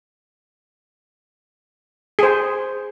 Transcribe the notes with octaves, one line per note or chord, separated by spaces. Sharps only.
G#4 C5